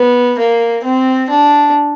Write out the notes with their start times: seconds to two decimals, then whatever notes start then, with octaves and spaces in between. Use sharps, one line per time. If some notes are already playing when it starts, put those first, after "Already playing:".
Already playing: B3
0.39 A#3
0.84 C4
1.30 D4